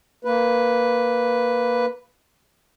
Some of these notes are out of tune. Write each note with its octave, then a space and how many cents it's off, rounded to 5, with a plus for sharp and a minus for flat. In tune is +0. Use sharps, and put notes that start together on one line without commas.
A#3 +0 B4 +0